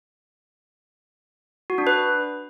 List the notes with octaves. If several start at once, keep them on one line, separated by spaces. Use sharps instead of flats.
F#4
D4
B4